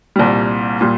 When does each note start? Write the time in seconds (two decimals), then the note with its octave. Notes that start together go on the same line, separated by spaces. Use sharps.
0.16 C2 A#2 G3
0.81 A#2 G3